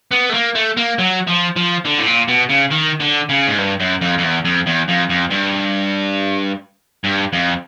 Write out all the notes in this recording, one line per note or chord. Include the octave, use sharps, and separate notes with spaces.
B3
A3
A#3
A3
A#3
F#3
F3
F3
D3
A2
A#2
B2
C#3
D#3
D3
C#3
G#2
G2
F#2
F2
F2
E2
F2
E2
F2
F2
G2
G2
F2